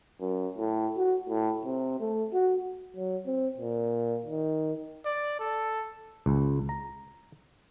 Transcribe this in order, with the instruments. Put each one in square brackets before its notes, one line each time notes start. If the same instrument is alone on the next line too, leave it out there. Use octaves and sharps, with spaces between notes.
[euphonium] F#2
A2
F#4
A2
C3
A3
F#4
F#3
C4
A#2
D#3
[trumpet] D5
A4
[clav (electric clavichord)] C#2
A#5